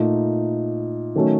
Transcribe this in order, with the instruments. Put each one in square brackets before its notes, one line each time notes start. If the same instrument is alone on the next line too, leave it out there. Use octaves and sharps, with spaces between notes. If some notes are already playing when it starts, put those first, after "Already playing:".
Already playing: [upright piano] A#2 A3 D#4
D#3 F#3 A3 C#4